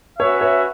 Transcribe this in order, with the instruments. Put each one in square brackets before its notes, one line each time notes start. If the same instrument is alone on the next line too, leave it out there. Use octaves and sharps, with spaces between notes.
[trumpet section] C#4 F#4 B4 E5 [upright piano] C#5
[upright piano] C#5